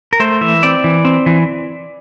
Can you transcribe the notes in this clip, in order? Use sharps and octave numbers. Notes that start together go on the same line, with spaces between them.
A#4
A3 C5
E3 E5
C4 D5
E3
C4
E3